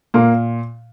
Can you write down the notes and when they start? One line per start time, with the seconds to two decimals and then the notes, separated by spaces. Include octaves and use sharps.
0.14 A#2 A#3